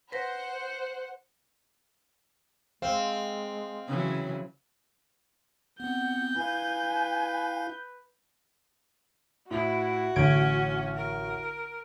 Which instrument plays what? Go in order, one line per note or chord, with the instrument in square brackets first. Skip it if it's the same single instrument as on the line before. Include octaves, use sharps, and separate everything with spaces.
[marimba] B4 A#6 [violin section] C5 F#5
[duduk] G#3 [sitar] C4 [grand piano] F5
[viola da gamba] C#3 E3 F#3
[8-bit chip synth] B3 C4 [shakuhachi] F#5 [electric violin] G6
[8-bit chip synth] E4 F5 [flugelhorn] B4 [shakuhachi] G#5
[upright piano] A2 [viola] E4 [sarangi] F#4
[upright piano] A1 [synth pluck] D3 G#6 D7 [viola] C#4
[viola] A#4